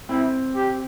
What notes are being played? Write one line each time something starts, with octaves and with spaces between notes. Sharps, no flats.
C4 E4
G4